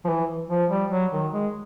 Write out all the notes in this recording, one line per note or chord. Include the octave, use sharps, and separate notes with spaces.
F3
E3
F3
G3
F#3
D#3
G#3